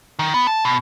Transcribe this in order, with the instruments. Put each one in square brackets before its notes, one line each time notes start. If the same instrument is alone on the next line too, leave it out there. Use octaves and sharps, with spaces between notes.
[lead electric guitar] D#3
B3
A5
B2